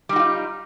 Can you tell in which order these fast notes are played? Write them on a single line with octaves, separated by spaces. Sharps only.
G3 D#4 F#4 F4